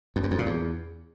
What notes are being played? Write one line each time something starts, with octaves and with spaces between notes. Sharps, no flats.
F2
F#2
F2
A#2
E2